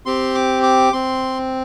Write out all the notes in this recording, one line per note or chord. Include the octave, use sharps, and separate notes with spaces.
C4 G4 C6
D6
D6
C4 C6